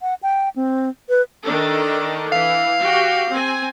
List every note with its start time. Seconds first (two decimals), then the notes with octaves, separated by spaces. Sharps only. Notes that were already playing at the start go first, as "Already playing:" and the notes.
0.01 F#5
0.23 G5
0.56 C4
1.09 B4
1.46 D#3 D4 A4
2.32 E3 F5
2.81 F#4 G4 G5
3.32 C4 G#5